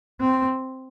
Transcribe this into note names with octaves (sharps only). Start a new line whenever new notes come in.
C4